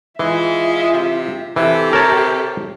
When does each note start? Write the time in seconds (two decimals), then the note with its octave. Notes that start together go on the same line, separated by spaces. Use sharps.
0.19 E3 G#3 F4 E5
0.93 C3
1.56 C3 E3 G4 A4
1.93 A#4 C#5 A5